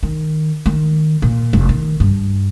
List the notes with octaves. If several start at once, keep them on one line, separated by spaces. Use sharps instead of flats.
D#3
D#3
A#2
F1
D#3
G2